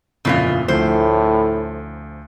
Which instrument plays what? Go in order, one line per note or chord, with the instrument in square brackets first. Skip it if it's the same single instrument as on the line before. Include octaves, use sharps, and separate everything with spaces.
[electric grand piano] G1 F2 A#2 [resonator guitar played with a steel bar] C#3 E3 F4
[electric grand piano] D2 F3 [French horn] A2 [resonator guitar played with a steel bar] C5